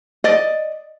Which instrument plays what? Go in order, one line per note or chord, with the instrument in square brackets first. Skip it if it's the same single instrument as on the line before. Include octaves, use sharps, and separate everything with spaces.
[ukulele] D5 D#5